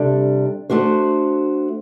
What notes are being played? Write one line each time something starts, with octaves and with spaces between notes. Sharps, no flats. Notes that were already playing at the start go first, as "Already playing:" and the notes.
Already playing: C3 G3 D4 A4
A3 D4 F#4 C5